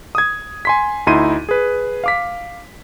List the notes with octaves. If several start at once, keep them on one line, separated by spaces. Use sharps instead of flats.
D#6 G#6
G#5 C6 B6
D2 D#4 E4 C6 D#7
G#4 B4
F5 D6 B6